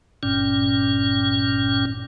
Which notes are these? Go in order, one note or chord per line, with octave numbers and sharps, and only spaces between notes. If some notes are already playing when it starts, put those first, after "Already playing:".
G1 G2 A#2 C#4